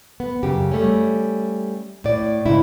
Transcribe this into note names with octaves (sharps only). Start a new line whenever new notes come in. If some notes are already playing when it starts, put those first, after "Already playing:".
B3
F#2 C#3 G4
G3 A3 C#4
A2 D5
G#2 C#3 E4